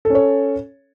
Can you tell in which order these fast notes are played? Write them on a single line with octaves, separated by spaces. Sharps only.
A4 C#4 C#5